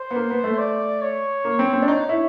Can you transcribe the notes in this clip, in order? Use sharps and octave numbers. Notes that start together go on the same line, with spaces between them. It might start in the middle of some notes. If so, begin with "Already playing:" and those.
Already playing: C5
B3
A#3
B3
A3
D5
C#5
A#3
C4
C4
D4
D#4 C#5
E4